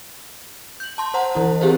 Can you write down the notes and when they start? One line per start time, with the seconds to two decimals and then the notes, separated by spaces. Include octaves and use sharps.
0.80 G6 F#7
0.98 A5 C6
1.14 C5 F#5 A#5
1.35 E3 E4
1.61 C4 G4 G#4 A#4 C5